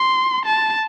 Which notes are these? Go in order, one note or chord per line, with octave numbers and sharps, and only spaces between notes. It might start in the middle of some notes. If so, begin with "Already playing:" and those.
Already playing: C6
A5